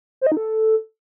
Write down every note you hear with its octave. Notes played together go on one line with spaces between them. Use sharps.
C5
D#5
D#4
A4